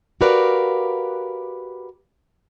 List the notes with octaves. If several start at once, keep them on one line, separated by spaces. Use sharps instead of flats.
F#4 G4 A#4 B4 D5 F5